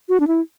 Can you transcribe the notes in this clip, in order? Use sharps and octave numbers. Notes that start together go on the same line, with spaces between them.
F#4
D4
E4